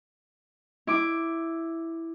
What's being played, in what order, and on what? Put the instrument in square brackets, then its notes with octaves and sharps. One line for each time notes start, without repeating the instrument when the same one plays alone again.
[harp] E4 D6